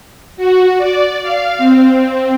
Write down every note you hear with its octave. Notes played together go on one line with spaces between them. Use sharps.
F#4
D5
F5
C4